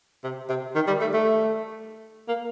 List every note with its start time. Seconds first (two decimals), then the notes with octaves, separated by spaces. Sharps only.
0.24 C3
0.49 C3
0.75 D#3
0.87 G3
1.00 A3
1.13 A3
2.28 A#3